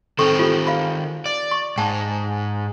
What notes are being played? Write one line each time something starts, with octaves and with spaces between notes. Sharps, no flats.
D#3 C4 A4 C#6
F4 G4 A4
F5 B5
D5
C#6
G#2 G5 A5